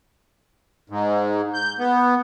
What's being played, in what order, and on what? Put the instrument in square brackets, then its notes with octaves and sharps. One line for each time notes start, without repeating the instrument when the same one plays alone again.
[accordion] G#2
G6
B3